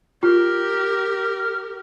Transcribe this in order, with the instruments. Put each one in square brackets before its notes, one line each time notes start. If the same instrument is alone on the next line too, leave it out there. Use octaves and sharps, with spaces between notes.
[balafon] F4 [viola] G4 A#4 [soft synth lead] F6